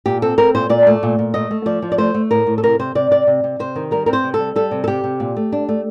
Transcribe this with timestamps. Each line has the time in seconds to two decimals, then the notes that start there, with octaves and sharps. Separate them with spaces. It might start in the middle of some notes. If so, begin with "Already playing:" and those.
0.06 A#2 G4
0.22 C4 A4
0.38 C4 A#4
0.55 A#2 C5
0.69 A#2 D5
0.87 A3
1.03 A#2
1.19 A#2
1.34 A3 D#5
1.51 A3
1.66 F3 D5
1.82 F3
1.92 D5
1.98 A3 C5
2.14 A3
2.31 A2 A#4
2.47 A2
2.58 A4
2.63 C3 A#4
2.79 C3 C5
2.95 C3 D5
3.10 C3 D5
3.27 C3
3.44 C3
3.59 C3 C5
3.76 D#3
3.91 G3 A#4
4.06 C4 A#4
4.13 C5
4.24 C3
4.34 A4
4.39 G3
4.56 G3 A4
4.71 C3
4.84 A4
4.87 C3 G4
5.04 C3
5.20 A#2
5.36 A3
5.52 D4
5.69 A3